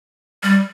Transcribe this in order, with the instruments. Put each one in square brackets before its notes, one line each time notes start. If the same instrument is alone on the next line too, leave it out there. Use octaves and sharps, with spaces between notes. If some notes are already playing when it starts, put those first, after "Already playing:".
[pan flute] G3